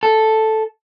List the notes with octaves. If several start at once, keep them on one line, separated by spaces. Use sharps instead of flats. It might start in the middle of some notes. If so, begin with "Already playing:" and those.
A4